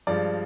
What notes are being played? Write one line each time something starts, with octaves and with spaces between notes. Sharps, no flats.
G2 F3 G#3 D5